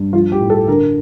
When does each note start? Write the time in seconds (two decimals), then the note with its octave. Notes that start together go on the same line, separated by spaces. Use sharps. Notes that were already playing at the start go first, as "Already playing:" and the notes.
Already playing: G2
0.13 F3 F4
0.32 G4
0.41 A2
0.50 A4
0.68 D3 A#4